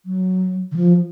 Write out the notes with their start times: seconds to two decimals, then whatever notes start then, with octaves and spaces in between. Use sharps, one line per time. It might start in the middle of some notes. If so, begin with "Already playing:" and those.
0.06 F#3
0.72 D3
0.76 F3